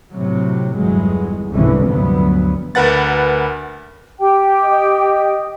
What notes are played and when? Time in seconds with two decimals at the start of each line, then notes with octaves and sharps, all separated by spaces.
0.13 A2 C3 F#3
0.76 G1 E2 F#3 G#3
1.53 F1 C2 G#2 D3 E3 C#4
1.86 D2 G2 F3 F#3 B3
2.75 D2 A#4 B4 F#5 A6
4.19 G4 G5
4.63 D#5